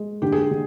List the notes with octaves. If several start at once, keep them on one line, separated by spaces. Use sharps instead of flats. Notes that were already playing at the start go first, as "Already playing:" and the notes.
Already playing: G#3
D3 G4
G#4
G4
D3